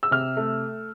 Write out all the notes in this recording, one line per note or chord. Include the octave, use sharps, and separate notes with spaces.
E6
C3 F6
A3